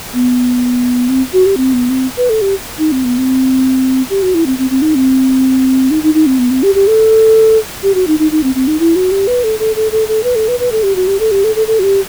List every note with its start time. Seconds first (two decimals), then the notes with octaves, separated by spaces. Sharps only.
0.14 B3
1.09 C4
1.33 F#4
1.46 G4
1.57 C4
1.73 B3
1.90 C4
2.17 B4
2.30 A4
2.42 G4
2.78 D#4
2.92 C4
3.04 B3
3.18 C4
4.10 G4
4.23 F#4
4.35 E4
4.46 C4
4.58 C4
4.70 C4
4.82 D#4
4.95 C4
5.91 D#4
6.03 D#4
6.14 D#4
6.26 C4
6.39 B3
6.51 C4
6.63 G4
6.75 G4
6.87 A4
7.83 G4
7.95 F#4
8.07 D#4
8.19 D#4
8.32 D#4
8.43 C4
8.55 C4
8.67 D#4
8.79 E4
8.96 F#4
9.11 G4
9.27 B4
9.44 A4
9.59 A4
9.76 A4
9.92 A4
10.08 A4
10.24 B4
10.35 A4
10.48 B4
10.60 B4
10.72 A4
10.83 G4
10.96 F#4
11.07 G4
11.20 A4
11.31 G4
11.44 A4
11.56 A4
11.67 A4
11.79 F#4
11.83 G4